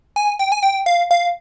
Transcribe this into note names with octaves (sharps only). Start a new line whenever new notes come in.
G#5
G5
G#5
G5
F5
F5